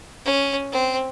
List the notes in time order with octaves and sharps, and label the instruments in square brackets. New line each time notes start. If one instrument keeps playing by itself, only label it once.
[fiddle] C#4
C4